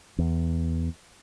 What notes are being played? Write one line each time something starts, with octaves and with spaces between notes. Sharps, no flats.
E2